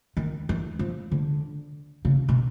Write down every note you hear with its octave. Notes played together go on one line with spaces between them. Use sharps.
D#3
E3
F3
D3
C#3
B2